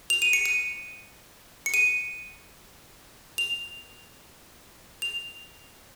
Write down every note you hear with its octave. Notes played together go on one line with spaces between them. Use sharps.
F7
D#7
C#7
D#7
C#7
D#7
F7
F7